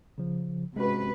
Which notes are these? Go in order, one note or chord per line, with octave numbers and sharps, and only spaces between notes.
C#3 F3
C3 G#3 C#4 F#4 B4